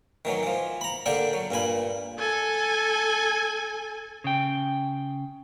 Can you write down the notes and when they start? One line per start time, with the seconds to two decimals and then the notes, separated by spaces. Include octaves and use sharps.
0.25 D#3 E3 F#3
0.43 E3 F3
0.81 A#5 B5
1.06 D3 A#3 D4 G4 A4 D5
1.33 F#3
1.51 G2 A#2 G#5 B5
2.19 A4 G#5
4.24 C#3 G5